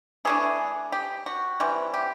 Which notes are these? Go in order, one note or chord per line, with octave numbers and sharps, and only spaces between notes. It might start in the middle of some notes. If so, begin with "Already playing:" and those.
E3 A3 D4 G#4
G4
F#4
C3 E3 G3
G4